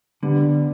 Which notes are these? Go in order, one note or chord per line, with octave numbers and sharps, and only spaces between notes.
D3 G3 B3